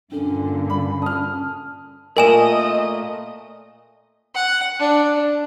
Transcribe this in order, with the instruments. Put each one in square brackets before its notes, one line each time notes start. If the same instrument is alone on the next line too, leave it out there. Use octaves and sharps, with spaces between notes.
[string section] G2 A#2 D3 [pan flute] C#4 [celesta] D4 A4
[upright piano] B5
[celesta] A5 [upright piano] D#6 F6
[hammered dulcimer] A#2 A3 [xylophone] A#4 G#5 E7 [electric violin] D#5
[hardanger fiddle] F#5
D4